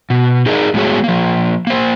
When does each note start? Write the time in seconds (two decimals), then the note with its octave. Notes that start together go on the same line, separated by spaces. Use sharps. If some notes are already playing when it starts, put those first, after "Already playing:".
0.10 B2
0.46 D#4 G#4 A#4 D5 D#5
0.74 A2 G#3 B3 F#4 G#4 C#5
1.04 F3 A#3
1.67 A#3 C5